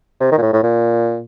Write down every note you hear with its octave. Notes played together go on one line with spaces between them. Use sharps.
C3
D#3
A#2
A2
A2
A#2